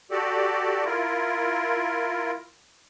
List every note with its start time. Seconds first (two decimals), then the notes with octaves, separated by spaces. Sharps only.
0.11 F#4 G4 A4 D5
0.85 E4 F4 A#4